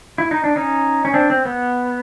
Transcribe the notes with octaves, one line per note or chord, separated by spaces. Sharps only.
E4
D#4
D4
C#4 D#4
C#4
C4 D4
C4
B3